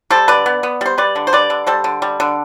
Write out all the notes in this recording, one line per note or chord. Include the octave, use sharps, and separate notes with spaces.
G3 A4 C5
D3 B4 D5
B3
B3
G3 C5
G3 B4 D5
D3
C5
G3 B4 D5
D3
G3 A4 C5
D3
G3
D3